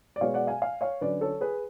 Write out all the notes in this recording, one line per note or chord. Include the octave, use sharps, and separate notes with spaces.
D5
B2 G#3 B3 C#5 F5
D5 F#5
F5 G#5
F5 G#5
C#5 F5
D3 F#3 C#4 B4 D5
A4 C#5
G#4 B4